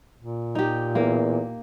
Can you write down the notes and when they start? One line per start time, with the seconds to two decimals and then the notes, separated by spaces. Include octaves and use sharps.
0.19 A#2
0.55 D#4 G4
0.95 E2 A#3